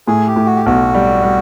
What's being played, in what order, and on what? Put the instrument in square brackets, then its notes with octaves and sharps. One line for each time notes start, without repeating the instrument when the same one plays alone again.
[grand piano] A2 [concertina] G#4
[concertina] G4
[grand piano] A2
[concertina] F#4
G4
[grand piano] B1 [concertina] F#4
[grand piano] G3
G3